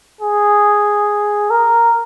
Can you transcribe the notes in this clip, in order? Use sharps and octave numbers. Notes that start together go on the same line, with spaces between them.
G#4
A#4